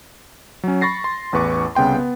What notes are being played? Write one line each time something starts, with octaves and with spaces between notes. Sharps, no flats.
F#3 C#4
B5 C#6 A6 A#6 C7
C6
A1 E2 B4 C#6 D6
C2 C#3 B3 G5 C6
B3